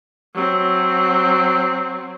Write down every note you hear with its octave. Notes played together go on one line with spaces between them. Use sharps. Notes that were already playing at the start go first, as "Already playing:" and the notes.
F#3 C4